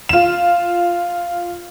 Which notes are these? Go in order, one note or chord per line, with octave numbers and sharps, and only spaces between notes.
F4 E7